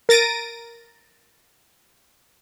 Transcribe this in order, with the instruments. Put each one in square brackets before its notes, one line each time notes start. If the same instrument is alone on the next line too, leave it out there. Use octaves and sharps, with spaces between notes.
[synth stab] A#4 A6 A#6 D7 D#7